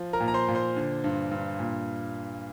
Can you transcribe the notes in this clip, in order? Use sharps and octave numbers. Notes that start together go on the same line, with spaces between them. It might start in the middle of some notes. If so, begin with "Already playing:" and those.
Already playing: F3
A#4 A#5
A#2
A#5
C5 C6
A#2
C5 C6
D3
G2
G2
A#2